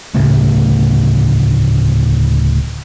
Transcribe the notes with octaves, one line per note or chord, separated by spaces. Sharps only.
D1 A2 C#3 A3